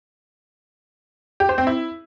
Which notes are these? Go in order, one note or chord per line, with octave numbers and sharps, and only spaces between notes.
G4
C5
C4
E4